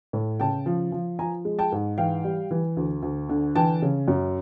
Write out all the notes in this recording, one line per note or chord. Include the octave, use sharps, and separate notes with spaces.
A2
C#3 G5 A5
F3
F3
F3 G#5 A#5
G#3
G5 A5
G#2
E3 F5 G5
G3
E3
D2
D2
D3
E3 G5 A5
C#3
F#2